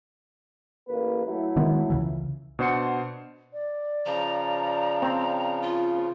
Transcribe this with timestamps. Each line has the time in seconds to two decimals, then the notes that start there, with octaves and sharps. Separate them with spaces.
0.88 A1 A#3 B4
1.25 F#3 A3 E4
1.56 D#3 G#3 B3
1.90 C#2 C#3 E3
2.59 B2 D4 C5 F#5 C6 C#7
3.53 D5
4.06 C#3 F3 A#5
5.02 C4
5.62 F4